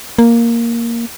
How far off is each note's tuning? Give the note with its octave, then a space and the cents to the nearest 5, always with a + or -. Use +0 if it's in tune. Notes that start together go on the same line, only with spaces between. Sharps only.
A#3 +0